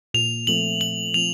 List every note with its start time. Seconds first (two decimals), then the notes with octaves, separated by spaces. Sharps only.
0.14 A#2 F7
0.47 F3 A3 C4 F4 F#7
0.81 A#2 F#7
1.14 F3 A3 C4 F4 F7